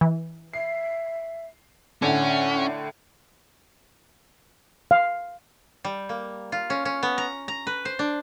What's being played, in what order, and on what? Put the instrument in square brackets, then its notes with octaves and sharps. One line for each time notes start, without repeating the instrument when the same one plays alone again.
[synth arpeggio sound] E3
[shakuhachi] E5 [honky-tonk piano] C7
[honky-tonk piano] A2 D3 [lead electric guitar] C#4 [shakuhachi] F#5
[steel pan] F5
[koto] G3
A#3
F4
C#4
C#4
B3
A#5
A#5
B4
C5
D4